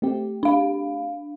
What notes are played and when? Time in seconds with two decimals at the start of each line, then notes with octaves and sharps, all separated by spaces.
0.02 A3 C4 G4
0.43 D4 F5